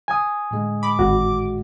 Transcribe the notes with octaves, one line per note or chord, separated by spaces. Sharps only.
G#5 D#6
A2 D3 G#3
B5 D6
G#1 F#4